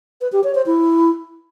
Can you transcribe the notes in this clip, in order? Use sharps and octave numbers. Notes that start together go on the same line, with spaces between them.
B4
G4
C#5
C5
E4